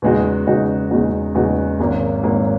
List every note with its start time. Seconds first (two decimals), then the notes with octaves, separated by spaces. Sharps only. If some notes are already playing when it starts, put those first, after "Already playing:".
0.02 E2 C#3 G#3 D#4 F#4
0.47 E2 C#3 G#3 D#4 F#4
0.91 E2 C#3 G#3 D#4 F#4
1.35 E2 C#3 G#3 D#4 F#4
1.79 G#1 G#2 F#3 A#3
2.23 G#1 G#2 F#3 A#3